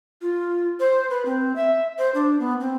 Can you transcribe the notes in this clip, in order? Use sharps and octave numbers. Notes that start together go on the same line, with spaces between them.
F4
C5
B4
C4
E5
C5
D4
B3
C4